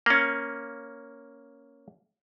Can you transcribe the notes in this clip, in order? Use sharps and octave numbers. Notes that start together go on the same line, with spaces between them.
A#3 C#4